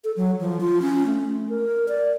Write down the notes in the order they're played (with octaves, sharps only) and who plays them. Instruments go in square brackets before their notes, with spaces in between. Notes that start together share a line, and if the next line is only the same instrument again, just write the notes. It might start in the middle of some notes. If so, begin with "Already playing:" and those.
[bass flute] A4
F#3
F3
F4
C#4
A3
A#4
D5